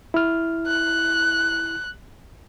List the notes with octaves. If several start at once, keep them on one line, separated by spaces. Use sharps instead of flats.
E4 F6
F#6